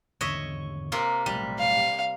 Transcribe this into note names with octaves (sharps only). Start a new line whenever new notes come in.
G#1 E2 D3 C#5 D#5 E5
C3 A#3 F4
B1 A2 G3
F5